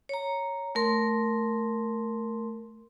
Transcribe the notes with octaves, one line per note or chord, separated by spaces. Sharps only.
C#5 A#5
A3 A#4 C6